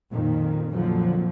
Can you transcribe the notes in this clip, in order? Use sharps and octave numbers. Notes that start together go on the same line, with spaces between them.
F2 A#2 D#3
F2 A#2 D3 F3 F#3